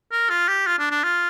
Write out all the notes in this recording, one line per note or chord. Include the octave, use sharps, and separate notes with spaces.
A#4
F4
G4
F4
D4
D4
F4